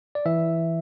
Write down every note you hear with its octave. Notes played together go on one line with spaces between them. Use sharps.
D5
E3 E5